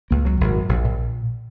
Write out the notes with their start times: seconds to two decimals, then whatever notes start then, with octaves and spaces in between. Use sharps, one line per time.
0.11 C#2 A#3
0.25 C#2 F#3
0.40 G#1
0.54 F#2
0.69 A#1
0.84 A#2